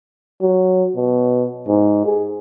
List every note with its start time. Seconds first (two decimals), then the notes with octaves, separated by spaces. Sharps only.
0.41 F#3
0.95 B2
1.68 G#2
2.06 G#4